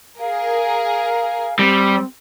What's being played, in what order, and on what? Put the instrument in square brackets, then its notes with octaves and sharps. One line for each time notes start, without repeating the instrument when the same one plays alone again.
[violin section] G#4 A#4 [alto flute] F5
[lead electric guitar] G3 [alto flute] C4